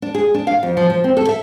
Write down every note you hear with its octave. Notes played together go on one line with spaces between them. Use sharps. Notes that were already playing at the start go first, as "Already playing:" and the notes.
D4
G#4
D4
F5
F2
F3
F3
C4
A4
E5